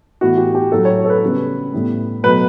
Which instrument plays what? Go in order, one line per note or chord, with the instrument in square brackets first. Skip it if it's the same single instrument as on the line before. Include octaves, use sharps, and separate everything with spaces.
[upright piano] A2 E3 B3 F#4
G4
G4
A2 F#3 A3 A4
C#5
A4
B4
C#3 G3 B3
A2 G3 B3
B2 F#3 A3 B4